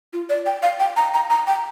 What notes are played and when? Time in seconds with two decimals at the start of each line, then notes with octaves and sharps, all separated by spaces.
0.13 F4
0.29 D5
0.46 G5
0.62 F5
0.80 G5
0.96 A#5
1.14 A#5
1.30 A#5
1.47 G5